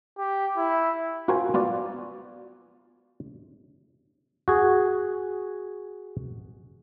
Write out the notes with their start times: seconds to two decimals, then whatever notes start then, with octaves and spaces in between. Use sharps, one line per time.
0.18 G4
0.57 E4
1.28 F4 F#4 A#4 C5 G5 G#5
1.54 B3 F4 F#4 D5
4.48 F#4 G#4